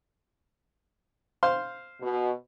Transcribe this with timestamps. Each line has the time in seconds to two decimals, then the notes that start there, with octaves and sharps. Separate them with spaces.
1.43 C5 F5 C6
2.01 B2